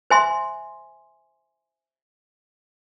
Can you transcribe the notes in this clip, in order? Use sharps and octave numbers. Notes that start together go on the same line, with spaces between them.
C5 E5 G#5 C6